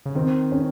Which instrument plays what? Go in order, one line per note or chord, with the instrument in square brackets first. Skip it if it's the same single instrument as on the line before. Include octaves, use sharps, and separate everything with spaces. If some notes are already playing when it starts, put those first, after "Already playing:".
[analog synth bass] C#3
[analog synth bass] D#3 [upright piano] C4
[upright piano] C#4